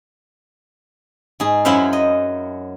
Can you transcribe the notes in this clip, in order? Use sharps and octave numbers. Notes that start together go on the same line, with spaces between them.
G#2 G#4
F#2 F#3 E4 C5 E5 F5
D#5